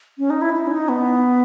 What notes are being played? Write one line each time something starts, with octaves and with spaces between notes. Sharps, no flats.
C#4
D#4
E4
E4
C#4
D#4
B3